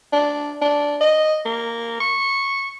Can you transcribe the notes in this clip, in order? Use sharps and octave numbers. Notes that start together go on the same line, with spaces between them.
D4
D4
D#5
A#3
C#6